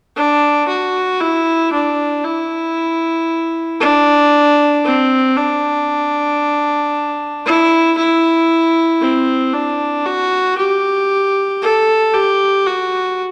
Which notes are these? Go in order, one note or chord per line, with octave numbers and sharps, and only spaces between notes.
D4
F#4
E4
D4
E4
D4
C4
D4
E4
E4
C4
D4
F#4
G4
A4
G4
F#4